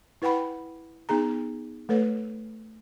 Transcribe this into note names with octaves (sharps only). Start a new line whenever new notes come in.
E4 B4 F#5 G5 B5
B3 D#4 G#4 A#5
A3 A4 B4 C#5